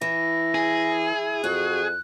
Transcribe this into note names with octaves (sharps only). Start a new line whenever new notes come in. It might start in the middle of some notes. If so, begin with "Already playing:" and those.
E3 E4 A#6
G#4
F2 F#4 F#6